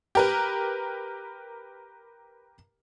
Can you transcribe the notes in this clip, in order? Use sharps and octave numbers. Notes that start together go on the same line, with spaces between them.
G4 A#4 B4